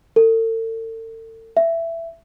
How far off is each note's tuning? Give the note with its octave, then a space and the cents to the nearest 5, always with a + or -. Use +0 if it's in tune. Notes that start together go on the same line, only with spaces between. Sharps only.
A4 +40
E5 +15